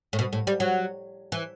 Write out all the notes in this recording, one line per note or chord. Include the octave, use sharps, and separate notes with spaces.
A2
B2
A2
G3
F#3
E3